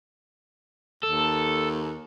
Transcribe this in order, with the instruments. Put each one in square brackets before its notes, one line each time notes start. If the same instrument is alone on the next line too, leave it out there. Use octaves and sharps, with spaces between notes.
[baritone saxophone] D#2 [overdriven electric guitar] A4